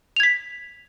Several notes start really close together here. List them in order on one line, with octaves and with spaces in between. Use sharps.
F7 G#6 B6